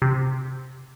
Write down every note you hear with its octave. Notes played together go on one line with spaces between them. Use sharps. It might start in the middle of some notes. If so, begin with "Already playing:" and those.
C3